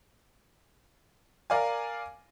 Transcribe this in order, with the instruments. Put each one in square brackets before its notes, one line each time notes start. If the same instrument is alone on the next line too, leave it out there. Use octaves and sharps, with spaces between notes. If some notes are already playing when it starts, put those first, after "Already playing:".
[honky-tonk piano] A#4 D5 F5 G#5